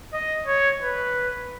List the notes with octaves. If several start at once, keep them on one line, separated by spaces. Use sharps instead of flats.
D#5
C#5
B4